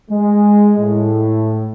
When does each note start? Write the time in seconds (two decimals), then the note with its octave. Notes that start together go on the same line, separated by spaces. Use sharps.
0.10 G#3
0.78 A2